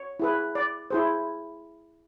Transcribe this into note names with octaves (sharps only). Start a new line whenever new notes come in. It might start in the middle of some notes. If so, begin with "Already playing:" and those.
Already playing: C#5
E4 G#4 B4
D5
E4 G#4 C5